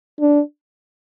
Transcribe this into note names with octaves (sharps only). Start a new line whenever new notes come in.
D4